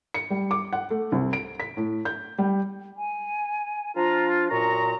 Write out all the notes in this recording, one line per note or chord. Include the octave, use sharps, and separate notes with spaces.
C#7
G3
D6
F#5
A3
C2
D7
B6
A2
G6
G3
G#5
F3 D4 F4 A#5
F#2 A#2 A#5 C#6